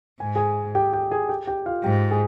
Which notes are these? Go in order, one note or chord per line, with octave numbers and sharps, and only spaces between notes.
G#2 G#5
G#4 G#5
G4 G5
G4 G5
G#4 G#5
G4 G5
G4 G5
F4 F5
G#2 G4 G5
G#4 G#5